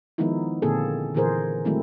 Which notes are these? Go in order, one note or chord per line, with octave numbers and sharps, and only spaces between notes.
D#3 F3 G#3 B3 D#4 E4
A#2 D3 A#3 C4 G#4 A4
A#2 D3 E3 G#4 A#4 C5
D#3 F#3 G#3 A3 C4 E4